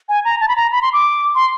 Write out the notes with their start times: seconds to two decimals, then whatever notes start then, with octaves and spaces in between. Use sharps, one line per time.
0.09 G#5
0.25 A#5
0.41 A5
0.48 B5
0.56 A#5
0.72 B5
0.82 C6
0.93 D6
1.35 C6